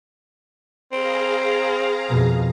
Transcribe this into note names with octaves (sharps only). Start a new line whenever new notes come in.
C4 G#4 F5 A#5
F2 B2